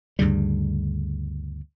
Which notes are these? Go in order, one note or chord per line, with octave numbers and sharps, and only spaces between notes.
D2 G2 C#3 G3